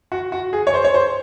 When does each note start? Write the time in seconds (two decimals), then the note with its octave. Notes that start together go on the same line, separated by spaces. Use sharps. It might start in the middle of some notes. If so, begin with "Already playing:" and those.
0.12 F#4
0.32 F#4
0.53 G#4
0.67 C#5
0.74 C5
0.84 C#5
0.94 C5